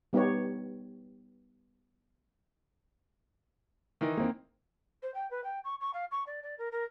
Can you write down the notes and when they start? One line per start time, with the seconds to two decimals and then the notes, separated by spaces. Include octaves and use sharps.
0.13 G3 B3 D#4 G4 B4 C#5
4.01 D#3 E3 D#4
4.17 A#3 C4
5.03 C5
5.14 G5
5.31 B4
5.44 G5
5.64 C#6
5.81 C#6
5.94 F5
6.11 C#6
6.27 D5
6.43 D5
6.58 A#4
6.72 A#4